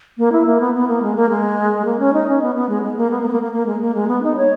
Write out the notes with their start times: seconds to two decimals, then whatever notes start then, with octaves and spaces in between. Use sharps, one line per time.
0.18 A#3
0.32 E4
0.46 A#3
0.61 B3
0.74 B3
0.88 A#3
1.02 G#3
1.16 A#3
1.29 G#3
1.85 A#3
1.99 C#4
2.13 D#4
2.28 C#4
2.42 B3
2.55 B3
2.69 G#3
2.83 G#3
2.97 A#3
3.11 B3
3.21 A#3
3.28 B3
3.32 A#3
3.42 A#3
3.53 A#3
3.66 G#3
3.81 A#3
3.95 G#3
4.08 B3
4.23 D#4
4.37 C#5